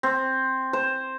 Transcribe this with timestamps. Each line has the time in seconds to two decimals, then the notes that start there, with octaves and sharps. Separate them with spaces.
0.03 C4
0.73 C5